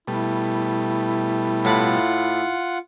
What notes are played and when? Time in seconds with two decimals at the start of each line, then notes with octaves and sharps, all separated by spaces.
0.08 B2 G3 A3 E4
1.65 A2 F4 F#5 A5 B5